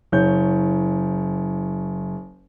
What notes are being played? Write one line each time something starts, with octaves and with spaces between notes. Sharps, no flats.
F#1 C#5 G6